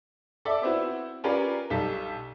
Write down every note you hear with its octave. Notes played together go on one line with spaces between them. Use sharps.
A4 D5 E5 D6
B3 C4 E4 F#4
C#4 F4 G4 A#4 B4 D5
B1 G3 A4 B6